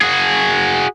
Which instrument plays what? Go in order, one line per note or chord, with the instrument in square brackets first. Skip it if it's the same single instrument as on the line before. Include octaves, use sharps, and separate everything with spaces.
[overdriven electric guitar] F#4 G#4